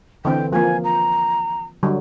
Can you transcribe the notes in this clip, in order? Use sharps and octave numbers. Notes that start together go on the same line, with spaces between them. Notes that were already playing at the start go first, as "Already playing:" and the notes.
D3 E3 C4 G5
F3 A#3 G#5
A#5
D3 F#3 G3